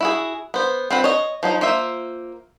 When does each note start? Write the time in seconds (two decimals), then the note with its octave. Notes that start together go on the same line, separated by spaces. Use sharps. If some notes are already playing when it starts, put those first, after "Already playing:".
0.01 E4 F#4 G#4
0.54 B3 C5
0.91 C4 F4 B4 F#5
1.04 C#5 D#5
1.43 F3 F#3 D#4
1.61 A#3 F4 C5 E5